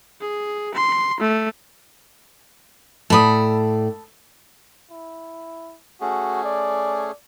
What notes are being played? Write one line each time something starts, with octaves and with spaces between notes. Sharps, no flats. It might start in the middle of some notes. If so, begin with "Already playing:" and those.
G#4
C6
A3
A2 A4 D5 B5 D#6
E4
A3 C#4 F#4 G#4
D5